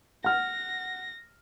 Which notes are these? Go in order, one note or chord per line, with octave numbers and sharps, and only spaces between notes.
F#5 F6 A#6